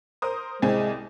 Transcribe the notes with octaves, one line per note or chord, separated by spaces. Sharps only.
A#4 C5 D#6
C2 G#3 C4 G#5